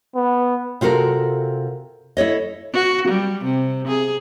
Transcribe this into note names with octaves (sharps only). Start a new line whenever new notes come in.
B3
C3 F4 F#4 A4 A#4
E4 A4 C#5 D#5
F#4
G3
C3
G#4